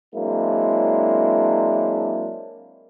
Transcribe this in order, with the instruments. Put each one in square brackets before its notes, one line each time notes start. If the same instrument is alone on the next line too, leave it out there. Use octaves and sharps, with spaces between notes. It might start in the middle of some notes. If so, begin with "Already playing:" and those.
[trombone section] F#3 G#3 A#3 C4 D4 E4